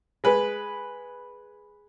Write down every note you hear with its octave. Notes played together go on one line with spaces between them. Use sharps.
G#3 B4